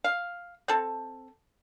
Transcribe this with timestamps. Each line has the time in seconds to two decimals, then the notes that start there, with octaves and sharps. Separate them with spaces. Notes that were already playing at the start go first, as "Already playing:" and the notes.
0.04 F5
0.68 C4 A4